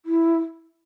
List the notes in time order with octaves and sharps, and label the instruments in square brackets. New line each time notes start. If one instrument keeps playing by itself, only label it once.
[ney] E4